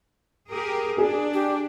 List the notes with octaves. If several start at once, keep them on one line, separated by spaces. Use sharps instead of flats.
G4 G#4 A#4
D4 G#4
G4